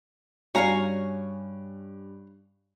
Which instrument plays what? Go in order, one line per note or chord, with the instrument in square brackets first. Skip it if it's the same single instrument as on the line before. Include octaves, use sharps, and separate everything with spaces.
[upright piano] G2 [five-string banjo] C#4 A#5 [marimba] F#4 D5 [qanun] C#5 F5 G#5